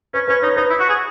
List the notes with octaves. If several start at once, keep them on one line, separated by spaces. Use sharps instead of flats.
C#4 B4
C#4 B4
D#4 C#5
D#4 B4
E4
F#4
G#4